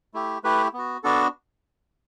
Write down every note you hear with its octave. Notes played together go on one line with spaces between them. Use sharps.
A3 E4 G4
A3 E4 G4 B4
B3 F#4
B3 D4 F#4 A4